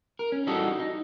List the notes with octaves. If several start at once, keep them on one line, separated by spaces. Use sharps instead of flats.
A#4
C#4
E3 F#3 G3 D#4 F#4 A4
D#4